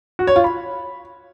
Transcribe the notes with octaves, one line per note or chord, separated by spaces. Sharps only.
F#4
C#5
F4
B5